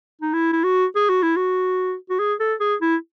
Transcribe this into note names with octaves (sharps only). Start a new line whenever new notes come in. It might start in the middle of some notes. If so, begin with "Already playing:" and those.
D#4
E4
E4
F#4
G#4
F#4
E4
F#4
F#4
G#4
A4
G#4
E4